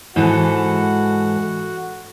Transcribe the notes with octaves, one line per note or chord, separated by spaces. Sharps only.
G#2 E3 F#4 A4 F#5